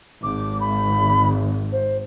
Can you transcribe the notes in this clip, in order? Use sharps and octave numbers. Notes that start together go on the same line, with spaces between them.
G#1 D6
B5
C5